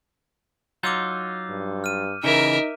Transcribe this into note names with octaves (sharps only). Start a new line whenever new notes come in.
F#3 D#4 F4 D6 E6 G6
G2
F6 D#7
C#3 E3 D#4 A#4 E5